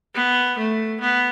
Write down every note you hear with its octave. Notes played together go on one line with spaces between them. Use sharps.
B3
A3
B3